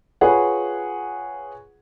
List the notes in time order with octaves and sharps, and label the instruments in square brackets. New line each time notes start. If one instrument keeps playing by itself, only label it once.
[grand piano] F4 G#4 B4 C#5 F#5